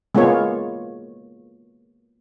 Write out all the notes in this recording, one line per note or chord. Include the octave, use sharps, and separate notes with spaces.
G#3 A#3 B3 F4 C#5